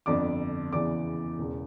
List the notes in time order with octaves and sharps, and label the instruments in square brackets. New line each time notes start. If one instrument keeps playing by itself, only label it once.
[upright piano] G1 F2 D3 D5 D6
E2 C#3 E3 D5 D6
E1 E2 C#3